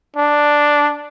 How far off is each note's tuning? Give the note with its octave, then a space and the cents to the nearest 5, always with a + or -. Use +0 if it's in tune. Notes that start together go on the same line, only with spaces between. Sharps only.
D4 +0